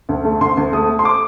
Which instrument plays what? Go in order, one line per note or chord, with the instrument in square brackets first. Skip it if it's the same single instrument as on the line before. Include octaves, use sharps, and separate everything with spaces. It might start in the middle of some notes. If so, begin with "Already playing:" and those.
[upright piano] D2
A3
D2 C6
D2
A3 D#6
A3
C6
D6